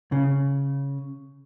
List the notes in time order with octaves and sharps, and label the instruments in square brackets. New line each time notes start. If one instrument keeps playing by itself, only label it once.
[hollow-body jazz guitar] C#3